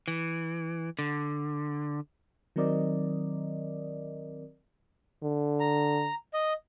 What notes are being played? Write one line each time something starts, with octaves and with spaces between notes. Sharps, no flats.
E3
D3
D#3 F#3 C4 A#4 D5 D#5
D3
A#5
D#5